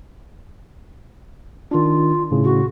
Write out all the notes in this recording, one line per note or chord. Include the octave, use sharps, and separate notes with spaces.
D#3 D4 F4
A2 C#3
F#4